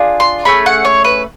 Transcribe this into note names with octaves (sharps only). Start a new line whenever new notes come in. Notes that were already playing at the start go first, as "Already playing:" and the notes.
Already playing: D4 F4 G#4
C6
A3 C#4 G#4 B5
F#5
C#5
B4